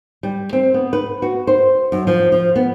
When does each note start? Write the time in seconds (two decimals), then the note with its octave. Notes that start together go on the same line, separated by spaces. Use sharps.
0.23 G3
0.53 C4
0.74 B3
0.93 B4
1.22 F#4
1.47 C5
1.92 F#2
2.07 F3
2.32 F3
2.56 B3